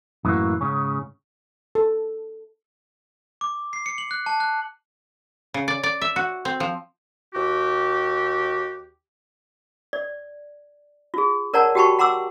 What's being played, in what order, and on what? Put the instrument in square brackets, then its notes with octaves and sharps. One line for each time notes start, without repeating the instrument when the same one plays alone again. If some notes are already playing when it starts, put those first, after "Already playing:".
[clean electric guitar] F#2 A2 E3 G#3 A#3 F#4
G#2 C#3 C#4
[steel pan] A4
[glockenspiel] D6
C7
C#7
F#7
F#6
A5
F#6
[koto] C#3
D5
D5
E5
F#4
C4
F3
[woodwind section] D#2 F#4 G4
[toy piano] D5
F4 G#4
A#4 C#5 D5 F#5 A5 A#5
F#4 G4 G5 A5 B5 C#6
F#5 A#5 C6 D6 E6